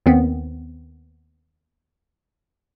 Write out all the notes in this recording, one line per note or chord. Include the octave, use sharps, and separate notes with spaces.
D#2 D#3 B3 C4